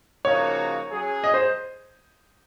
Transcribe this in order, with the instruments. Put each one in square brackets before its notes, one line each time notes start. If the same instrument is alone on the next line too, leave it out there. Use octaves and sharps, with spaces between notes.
[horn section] C#3 F3 A#3 D#4 F#4 [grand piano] C#5
[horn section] F#3 C#4 G#4
[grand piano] D#5
C5